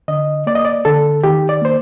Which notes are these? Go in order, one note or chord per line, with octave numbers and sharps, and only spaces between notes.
D3 D#5
A#3 D5
D#5
D5
D3 A4
D#3 G4
D5
A#3 C5